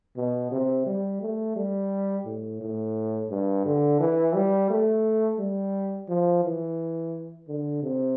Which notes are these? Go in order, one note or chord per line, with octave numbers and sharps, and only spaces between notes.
B2
C3
G3
A3
G3
A2
A2
G2
D3
E3
G3
A3
G3
F3
E3
D3
C3